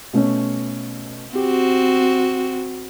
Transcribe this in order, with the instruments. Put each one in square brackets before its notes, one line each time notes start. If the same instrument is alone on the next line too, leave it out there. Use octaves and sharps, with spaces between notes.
[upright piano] B2 A3 C#4
[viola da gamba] C4 F#4 [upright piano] G4